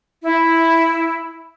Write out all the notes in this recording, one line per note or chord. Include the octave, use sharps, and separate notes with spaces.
E4